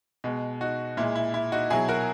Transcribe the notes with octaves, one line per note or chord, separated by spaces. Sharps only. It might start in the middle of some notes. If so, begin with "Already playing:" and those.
B2 G#3
D#4 F#4
A#2 G#3 E4
E4
E4
D#4 F#4
B2 F#3 E4 G#4
F#4 A#4